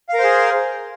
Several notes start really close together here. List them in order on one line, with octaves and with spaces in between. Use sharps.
F5 A#4 C5 G#4